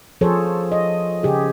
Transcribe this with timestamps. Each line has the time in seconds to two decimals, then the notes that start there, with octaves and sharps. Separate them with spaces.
0.21 F3 G#4 A4 C5 C#5
0.72 D#5
1.23 C#3 G4 G#4